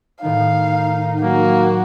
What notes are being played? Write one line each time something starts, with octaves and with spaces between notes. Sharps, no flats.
A2 D#3 A3 D#4 F5
F#3 A#3 F#4